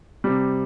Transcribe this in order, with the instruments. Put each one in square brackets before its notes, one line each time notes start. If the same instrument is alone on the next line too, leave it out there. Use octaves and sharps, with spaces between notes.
[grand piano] C3 G3